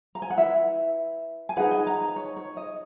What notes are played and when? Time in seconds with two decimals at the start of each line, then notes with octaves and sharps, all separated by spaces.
0.15 A#5
0.22 G#5
0.30 F#5
0.38 E4 B4 E5
1.49 G#5
1.57 D#4 G#4 B4 F#5
1.71 G#5
1.87 A#5
2.01 A#5
2.16 C#5
2.37 C#5
2.57 D#5